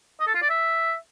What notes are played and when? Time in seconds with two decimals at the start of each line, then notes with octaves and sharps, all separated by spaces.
0.20 D#5
0.27 A4
0.35 F4
0.42 D5
0.50 E5